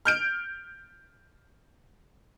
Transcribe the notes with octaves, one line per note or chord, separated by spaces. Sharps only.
F6 G6 D7